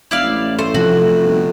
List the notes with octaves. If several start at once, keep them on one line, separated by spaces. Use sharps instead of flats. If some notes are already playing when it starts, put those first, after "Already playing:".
E1 E4 D5 F5
A1
A3 C5
C3 F3 F#4
G1